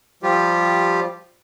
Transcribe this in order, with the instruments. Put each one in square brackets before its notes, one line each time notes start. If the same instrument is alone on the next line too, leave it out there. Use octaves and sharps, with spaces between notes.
[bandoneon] F3 G3 F4 G4